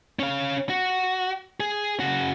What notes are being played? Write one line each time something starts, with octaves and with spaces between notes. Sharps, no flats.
C#4 F5
F#4
G#4
C#3 F#4